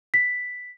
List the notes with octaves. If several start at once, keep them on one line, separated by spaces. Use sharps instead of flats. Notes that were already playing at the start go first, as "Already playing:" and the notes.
B6